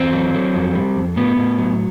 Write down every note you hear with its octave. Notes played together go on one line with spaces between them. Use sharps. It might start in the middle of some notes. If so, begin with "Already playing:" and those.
Already playing: E2 C4
F#3
F#3
F2
G3
F2
A2 B3
A2
F#3